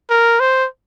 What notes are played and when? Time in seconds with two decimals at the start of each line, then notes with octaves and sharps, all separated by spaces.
0.10 A#4
0.40 C5